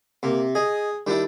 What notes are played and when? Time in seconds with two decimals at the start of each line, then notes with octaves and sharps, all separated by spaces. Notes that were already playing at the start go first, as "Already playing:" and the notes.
0.23 C3 A#3
0.55 G#4 D#5
1.07 D#3 G3 D4 E4